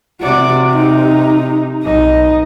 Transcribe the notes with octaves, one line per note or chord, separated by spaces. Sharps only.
C3 F#4 D5
D#4
B1 D#4 D#5